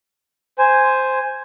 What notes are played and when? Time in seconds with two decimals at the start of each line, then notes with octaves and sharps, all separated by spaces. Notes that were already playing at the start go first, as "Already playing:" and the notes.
0.58 C5 G#5